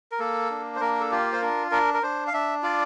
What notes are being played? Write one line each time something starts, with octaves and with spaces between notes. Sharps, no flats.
A#4
A#3 A4
D4
C5
A#3 A#4
A4
F4 G4
C5
D4 A#4
D4 A#4
A#4
D4 C5
F5
D4 E5
F4 D5